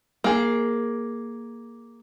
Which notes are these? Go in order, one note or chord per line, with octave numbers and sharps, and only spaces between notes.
A#3 G#4